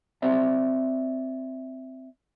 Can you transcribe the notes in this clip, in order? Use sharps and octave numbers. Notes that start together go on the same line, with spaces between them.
C4 C5 D5 E5